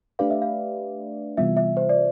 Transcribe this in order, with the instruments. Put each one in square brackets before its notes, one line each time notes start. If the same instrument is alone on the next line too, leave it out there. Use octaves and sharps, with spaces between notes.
[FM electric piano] A3 D4 G4 B4 D5 [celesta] F5
[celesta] E5
F5
[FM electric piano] C3 E3 G3 B3 F4 [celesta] E5
[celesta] E5
C5
D5